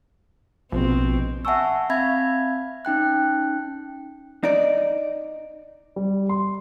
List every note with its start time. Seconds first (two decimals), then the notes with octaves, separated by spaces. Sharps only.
0.72 A#1 B2 C4
1.45 E5 F#5 G#5 A5 C#6 E6
1.90 C4 E5 F5 B5 G#6
2.85 C#4 D#4 G5 F#6
4.44 D#4 D5
5.96 G3
6.29 C6